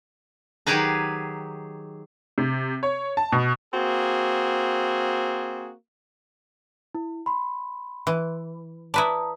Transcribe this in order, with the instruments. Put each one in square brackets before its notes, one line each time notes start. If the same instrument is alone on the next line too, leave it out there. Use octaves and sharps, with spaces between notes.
[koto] D#3 F#3 G4 G#4 B4 A#5
[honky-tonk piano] C3
C#5
A5
B2
[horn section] A#3 C4 F#4 G#4
[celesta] E4
B5 C6
[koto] E3
[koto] E4 B4 D5 [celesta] A5 A#5 D#6